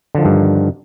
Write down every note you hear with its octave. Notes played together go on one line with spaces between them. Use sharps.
G2 D3 D#3 F3